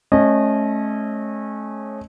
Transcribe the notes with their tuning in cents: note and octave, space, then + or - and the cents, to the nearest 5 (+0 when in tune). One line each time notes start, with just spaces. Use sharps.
A3 -35 C#4 -25 D#5 -20